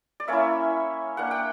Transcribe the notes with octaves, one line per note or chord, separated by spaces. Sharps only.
D5
A#3 C#4 E4 C#5 E5
A#3 D4 F#5
G5